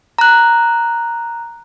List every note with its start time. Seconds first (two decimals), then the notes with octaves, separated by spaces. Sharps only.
0.19 A#5 F#6